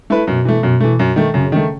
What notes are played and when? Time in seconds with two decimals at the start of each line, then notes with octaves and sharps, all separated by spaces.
0.10 A3 E4 B4
0.27 F#2 B2
0.45 E3 A3
0.63 F#2 B2
0.80 E3 A3
0.99 F#2
1.16 D#3 A3
1.34 F#2 C#3
1.52 D#3 A3